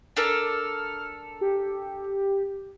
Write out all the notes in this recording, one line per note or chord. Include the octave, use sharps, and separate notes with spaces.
D4 A4 A#4 F6
G4